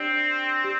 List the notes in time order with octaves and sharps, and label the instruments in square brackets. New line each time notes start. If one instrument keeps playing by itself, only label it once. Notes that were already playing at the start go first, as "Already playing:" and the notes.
Already playing: [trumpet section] C4 [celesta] D4 G4 D5 G5 D6
[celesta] G4